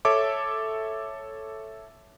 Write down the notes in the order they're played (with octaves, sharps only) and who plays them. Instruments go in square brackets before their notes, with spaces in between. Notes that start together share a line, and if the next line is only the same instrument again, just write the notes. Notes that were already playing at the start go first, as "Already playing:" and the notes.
[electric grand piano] A4 C#5 E5 D6